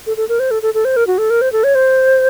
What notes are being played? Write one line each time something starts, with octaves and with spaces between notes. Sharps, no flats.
A4
A4
A#4
C5
A4
A4
A4
C5
A#4
F#4
A4
A#4
C5
A4
C#5
C5